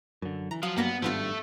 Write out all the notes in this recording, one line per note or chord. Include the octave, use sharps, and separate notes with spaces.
F#2 D3
E3 A#5
F3 F#3 F5 D#6
G2 A#3 B3 A#6
G#1 G2 F3 A3 B3 F4